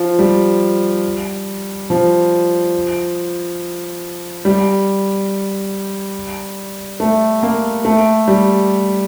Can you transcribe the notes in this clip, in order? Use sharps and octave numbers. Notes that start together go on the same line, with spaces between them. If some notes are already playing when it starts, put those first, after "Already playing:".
Already playing: F3
G3
F3
G3
A3
A#3
A3
G3